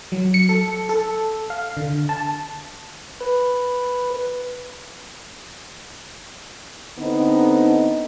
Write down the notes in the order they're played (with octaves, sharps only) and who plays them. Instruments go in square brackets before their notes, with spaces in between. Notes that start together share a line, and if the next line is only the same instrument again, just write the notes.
[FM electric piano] F#3
C#7
A4
A4
F5
D3
A5
[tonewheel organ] B4
[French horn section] D3 B3 C4 D#4